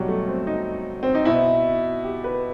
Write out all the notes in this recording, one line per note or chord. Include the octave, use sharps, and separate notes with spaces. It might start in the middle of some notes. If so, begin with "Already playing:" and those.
Already playing: B2 F#3 G3
A3
C4
D#4
C4
D#4
B2 E4
G4
B4